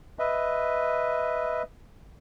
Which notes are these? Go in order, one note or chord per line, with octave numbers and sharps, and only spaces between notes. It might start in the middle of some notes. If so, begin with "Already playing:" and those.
B4 D#5 E5